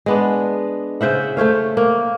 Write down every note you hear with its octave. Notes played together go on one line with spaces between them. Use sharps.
G#3 B3 D4
C#3 C5 E5 F#5
A3 C5 C#5 F5
A#3